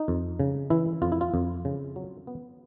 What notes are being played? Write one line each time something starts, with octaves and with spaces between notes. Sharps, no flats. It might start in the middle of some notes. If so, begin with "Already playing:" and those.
Already playing: D#4
F2
C#3
E3 E4
F2 F4
E4
F4
F2
C#3
F#3
B3